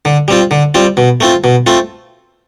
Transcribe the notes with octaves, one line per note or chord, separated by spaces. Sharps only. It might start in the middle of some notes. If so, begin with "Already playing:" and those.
D3
G3 C4 F4
D3
G3 C4 F4
B2
A3 C4 F4
B2
A3 C4 F4